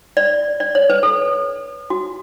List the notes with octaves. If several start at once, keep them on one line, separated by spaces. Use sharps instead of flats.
D5
D5
C#5
B4
A4
F#4